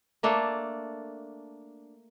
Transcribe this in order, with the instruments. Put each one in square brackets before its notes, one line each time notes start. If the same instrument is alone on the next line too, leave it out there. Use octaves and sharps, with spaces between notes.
[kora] A3 A#3 D4 A4